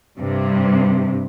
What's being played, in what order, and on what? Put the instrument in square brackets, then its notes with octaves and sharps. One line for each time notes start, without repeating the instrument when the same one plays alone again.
[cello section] G2 C3